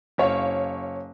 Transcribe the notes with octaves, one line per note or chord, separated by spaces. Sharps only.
F#1 C#5 F5